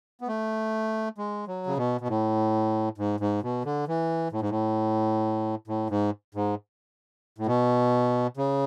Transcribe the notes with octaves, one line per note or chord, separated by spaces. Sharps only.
B3
A3
G#3
F#3
C#3
B2
B2
A2
G#2
G#2
B2
D3
E3
A2
G#2
A2
A2
G#2
G#2
A2
B2
C#3